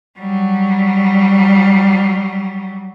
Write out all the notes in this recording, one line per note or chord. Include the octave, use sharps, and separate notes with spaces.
F#3 G3